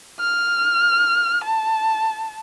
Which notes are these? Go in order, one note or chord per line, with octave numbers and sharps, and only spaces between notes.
F6
A5